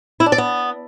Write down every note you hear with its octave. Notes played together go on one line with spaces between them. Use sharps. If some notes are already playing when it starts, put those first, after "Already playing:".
E4
D4
D5
B3